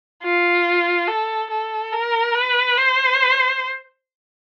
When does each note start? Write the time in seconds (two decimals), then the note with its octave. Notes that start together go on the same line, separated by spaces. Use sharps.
0.23 F4
1.08 A4
1.51 A4
1.92 A#4
2.35 B4
2.77 C5